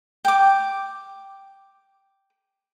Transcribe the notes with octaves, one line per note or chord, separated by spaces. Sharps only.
G5 D6